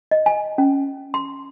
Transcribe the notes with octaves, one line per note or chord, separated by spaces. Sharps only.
D#5
G#5
C#4
C6